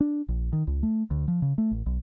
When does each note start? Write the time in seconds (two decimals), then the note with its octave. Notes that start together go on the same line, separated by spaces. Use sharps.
0.01 D4
0.28 A#1
0.53 D#3
0.67 C#2
0.83 A3
1.11 D2
1.28 F3
1.42 C#3
1.58 A3
1.71 A1
1.86 B1